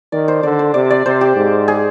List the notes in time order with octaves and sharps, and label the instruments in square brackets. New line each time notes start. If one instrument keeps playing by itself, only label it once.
[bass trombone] D#3 [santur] D5
[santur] C5
[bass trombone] D3 [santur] D5
[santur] C5
[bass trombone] C3 [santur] D5
[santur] D5
[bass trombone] C3 [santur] C5
[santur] G4
[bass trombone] G#2
[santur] G#4